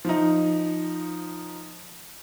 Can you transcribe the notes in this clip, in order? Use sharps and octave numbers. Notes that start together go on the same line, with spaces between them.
F3 D#4